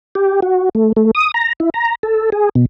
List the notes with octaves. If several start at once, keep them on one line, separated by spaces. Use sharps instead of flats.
G4
F#4
A3
A3
D#6
A#5
E4
A#5
A4
G#4
B2